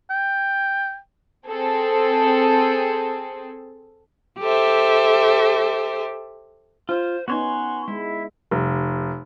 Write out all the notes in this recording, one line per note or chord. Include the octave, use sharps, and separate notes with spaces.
G5
C4 G#4 A4
G4 A4 C5 E5
F4 C5
B3 C#4 D#4 F#4 C#5 G#5 C6
G#3 E4
F1